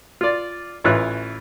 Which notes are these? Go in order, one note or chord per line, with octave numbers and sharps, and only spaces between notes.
F4 D5
A1 E3 F4 C#5 F#6